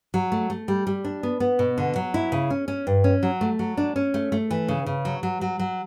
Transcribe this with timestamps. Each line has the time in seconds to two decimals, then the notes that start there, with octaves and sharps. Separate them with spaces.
0.14 F#3
0.32 A3
0.50 A3
0.68 G3
0.87 G3
1.05 D4
1.23 B3
1.40 B3
1.59 B2
1.78 D3
1.96 F#3
2.14 E4
2.32 C#3
2.50 C#4
2.68 C#4
2.87 G2
3.04 C#4
3.23 F#3
3.41 A3
3.59 F#3
3.77 D4
3.96 C#4
4.14 A3
4.32 A3
4.51 E3
4.68 C#3
4.86 C#3
5.05 F#3
5.23 F#3
5.41 F#3
5.59 F#3